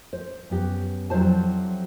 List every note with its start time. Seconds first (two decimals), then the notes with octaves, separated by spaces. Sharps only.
0.13 C5
0.50 F#2 B3 G4
1.10 F2 F#3 G3 E4 C5 A5